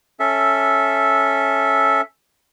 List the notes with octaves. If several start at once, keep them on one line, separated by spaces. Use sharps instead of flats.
C#4 A4 E5